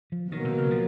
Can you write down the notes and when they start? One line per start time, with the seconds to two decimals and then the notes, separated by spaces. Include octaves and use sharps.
0.12 F3
0.31 B2 D#3 F#3 A#3
0.45 C3
0.58 C#3
0.71 F3